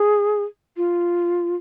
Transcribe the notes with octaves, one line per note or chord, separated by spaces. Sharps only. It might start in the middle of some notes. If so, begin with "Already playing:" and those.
Already playing: G#4
F4